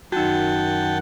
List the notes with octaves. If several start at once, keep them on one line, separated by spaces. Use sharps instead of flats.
F#2 D#3 D#4 F#4 F#5 G5 A5